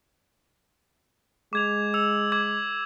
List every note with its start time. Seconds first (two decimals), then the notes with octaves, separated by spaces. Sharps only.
1.53 G#3 D6 G#6 F7
1.94 E6 F7
2.32 D6 G#6